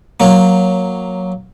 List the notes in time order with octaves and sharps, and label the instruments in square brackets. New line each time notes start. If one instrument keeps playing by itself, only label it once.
[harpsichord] F#3 A#3